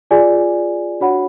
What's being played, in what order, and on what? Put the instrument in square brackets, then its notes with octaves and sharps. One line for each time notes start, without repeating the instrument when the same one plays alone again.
[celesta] F4 G#4 D5 G#5
D4 F#4 C#5 F#5 B5